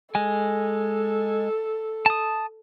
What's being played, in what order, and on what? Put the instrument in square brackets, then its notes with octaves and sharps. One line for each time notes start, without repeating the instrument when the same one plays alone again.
[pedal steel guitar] G#3 G#5 [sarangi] A4
[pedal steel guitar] A5 D#6